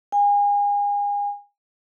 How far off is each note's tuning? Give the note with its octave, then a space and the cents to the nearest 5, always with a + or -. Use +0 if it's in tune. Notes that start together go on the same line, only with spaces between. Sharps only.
G#5 -35